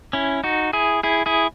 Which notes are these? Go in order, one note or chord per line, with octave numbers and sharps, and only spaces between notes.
C#4 E4
D#4 F#4
E4 G#4
E4 G#4
E4 G#4